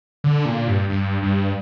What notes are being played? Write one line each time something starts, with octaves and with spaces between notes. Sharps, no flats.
D3
A#2
G2
G2
G2